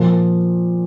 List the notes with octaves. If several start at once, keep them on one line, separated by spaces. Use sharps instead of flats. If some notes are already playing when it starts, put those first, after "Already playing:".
Already playing: A#2 F3